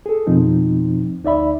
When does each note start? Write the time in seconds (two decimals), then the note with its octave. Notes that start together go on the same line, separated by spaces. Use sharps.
0.06 G#4 A4
0.27 F2 B2 F3 C4 D#4
1.23 D2 D#4 D5 E5 B5